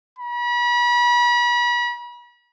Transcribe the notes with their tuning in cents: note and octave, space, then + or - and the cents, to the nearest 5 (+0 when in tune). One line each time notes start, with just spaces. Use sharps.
B5 -40